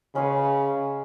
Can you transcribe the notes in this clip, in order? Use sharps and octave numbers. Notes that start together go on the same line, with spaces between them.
C#3 G#3 C#4 G#4 B4